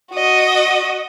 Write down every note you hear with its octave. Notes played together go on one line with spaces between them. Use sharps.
F#4 D#5